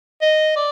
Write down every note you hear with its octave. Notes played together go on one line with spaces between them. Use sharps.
D#5
D5